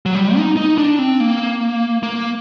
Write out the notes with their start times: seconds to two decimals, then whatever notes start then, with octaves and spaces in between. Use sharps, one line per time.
0.06 F#3
0.15 G3
0.37 D#4
0.57 D#4
0.78 D4
0.99 C4
1.20 A#3
2.03 A#3